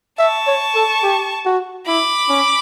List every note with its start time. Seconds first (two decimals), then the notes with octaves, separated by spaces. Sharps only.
0.19 E5 A5 C#6
0.47 C#5
0.75 A4
1.03 G4
1.45 F#4
1.86 E4 B5 D6
2.29 C#4